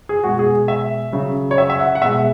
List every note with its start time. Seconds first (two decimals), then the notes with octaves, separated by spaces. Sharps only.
0.09 G#4
0.24 B2 G#3 F#4
0.39 G#4
0.68 E5
1.13 C#3 F#3
1.51 C#5
1.58 E5
1.70 E5
1.79 F#5
1.95 F#5
2.02 B2 G#3 E5